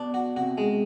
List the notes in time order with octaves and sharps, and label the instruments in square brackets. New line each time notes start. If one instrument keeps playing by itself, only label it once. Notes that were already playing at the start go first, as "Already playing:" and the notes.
Already playing: [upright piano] B2 [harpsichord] D4
[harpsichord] F#4
[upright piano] C3 [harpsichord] F#4
[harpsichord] G#3